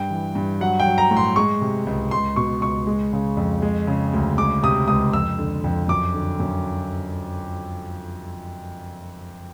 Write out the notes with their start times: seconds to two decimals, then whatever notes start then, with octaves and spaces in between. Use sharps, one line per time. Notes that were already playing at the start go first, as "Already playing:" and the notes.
Already playing: G2 G5
0.10 E3
0.35 G2
0.60 F#3 F#5
0.80 G5
0.86 F#3
0.98 A#5
1.11 A2
1.17 C6
1.36 G#3 C#6
1.61 C3
1.87 C#2
2.11 C#2 C6
2.36 B2 C#6
2.61 C#2 C#6
2.87 G#3
3.13 C#3
3.37 F2
3.62 G#3
3.87 C#3
4.13 D2
4.38 G#3 D6
4.63 C3 D#6
4.88 C#2 D#6
5.13 F2 E6
5.38 D3
5.64 F2
5.88 F#2 D6
6.14 D3
6.40 F#2